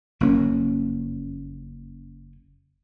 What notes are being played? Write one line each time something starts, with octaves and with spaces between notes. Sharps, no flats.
F#1 F2 A#3 C#4